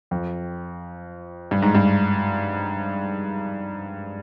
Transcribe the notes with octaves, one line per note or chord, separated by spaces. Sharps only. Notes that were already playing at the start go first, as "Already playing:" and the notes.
F2
G2
G#2
G2